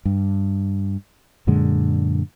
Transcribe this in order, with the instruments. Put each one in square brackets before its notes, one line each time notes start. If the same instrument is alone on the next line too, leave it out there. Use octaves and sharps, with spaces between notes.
[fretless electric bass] G2
F#2 A#2 D3 G#3